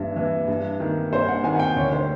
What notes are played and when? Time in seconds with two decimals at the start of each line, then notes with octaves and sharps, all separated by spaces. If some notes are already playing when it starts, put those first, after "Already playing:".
Already playing: G2 E3
0.16 E3
0.48 G2
0.80 D#3
1.12 G2 C5
1.28 F#5
1.44 D#3 G#5
1.56 F#5
1.59 G5
1.76 D2 C#5
1.93 C5